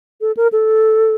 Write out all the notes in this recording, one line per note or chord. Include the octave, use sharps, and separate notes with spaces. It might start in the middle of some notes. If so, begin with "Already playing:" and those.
A4
A#4
A4